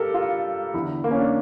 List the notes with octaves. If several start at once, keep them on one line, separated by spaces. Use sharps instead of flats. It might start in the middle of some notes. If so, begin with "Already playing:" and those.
Already playing: G2 G4 A4 A#4
F4
E2 D3 E4
A#3
C#4
D4